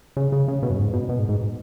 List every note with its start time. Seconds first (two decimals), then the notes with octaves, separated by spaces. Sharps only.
0.17 C#3
0.32 C#3
0.48 C#3
0.62 B2
0.70 F#2
0.78 G#2
0.93 B2
1.09 B2
1.19 G#2
1.29 G#2